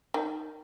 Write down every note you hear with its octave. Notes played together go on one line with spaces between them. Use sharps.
D#3